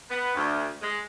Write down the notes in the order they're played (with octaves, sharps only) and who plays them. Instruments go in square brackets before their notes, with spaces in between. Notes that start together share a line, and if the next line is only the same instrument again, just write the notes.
[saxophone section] B3
D2
G#3